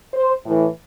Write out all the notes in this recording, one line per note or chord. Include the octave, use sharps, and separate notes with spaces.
C5
A2 E3